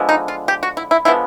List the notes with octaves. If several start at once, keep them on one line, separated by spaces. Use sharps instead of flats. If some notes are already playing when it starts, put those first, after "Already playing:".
Already playing: D3 F3 G#3 B3
D#4
F4
G4
F#4
E4
E4
D3 F3 G#3 B3 E4